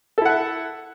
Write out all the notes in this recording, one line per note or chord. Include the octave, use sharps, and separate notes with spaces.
E4 A4 E5 F#5